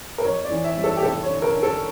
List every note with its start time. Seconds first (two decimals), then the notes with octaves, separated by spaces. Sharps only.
0.18 A#4
0.25 F2 C#5
0.44 D5
0.50 E3
0.64 E5
0.77 G3
0.84 A4
0.96 G4
1.03 F1 A4
1.23 C#5
1.30 D3
1.42 A#4
1.56 D3
1.63 A4